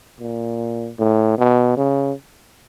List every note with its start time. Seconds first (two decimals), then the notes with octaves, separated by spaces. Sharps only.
0.20 A#2
0.99 A2
1.38 B2
1.77 C#3